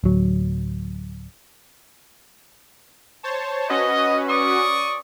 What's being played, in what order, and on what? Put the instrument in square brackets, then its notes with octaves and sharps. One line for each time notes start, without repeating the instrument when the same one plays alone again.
[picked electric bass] D1 F#3
[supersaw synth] C5 C#5 A5
[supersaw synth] C#4 F#4 B4 [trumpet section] D#5
[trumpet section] D5 C#6 D#6